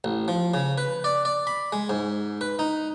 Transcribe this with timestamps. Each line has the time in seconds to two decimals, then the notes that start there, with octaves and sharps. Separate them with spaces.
0.04 A1
0.28 F3
0.54 C#3
0.78 B4
1.04 D5
1.25 D5
1.47 B5
1.73 G#3
1.90 G#2
2.41 B4
2.59 D#4